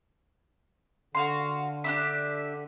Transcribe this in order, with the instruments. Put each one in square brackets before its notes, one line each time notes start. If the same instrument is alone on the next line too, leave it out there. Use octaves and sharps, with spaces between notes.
[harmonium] D3 [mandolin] F#4 F5 C6
[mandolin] D4 G4 E5